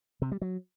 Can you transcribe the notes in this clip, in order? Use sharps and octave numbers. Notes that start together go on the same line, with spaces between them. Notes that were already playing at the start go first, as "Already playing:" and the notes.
C3
G3
F#3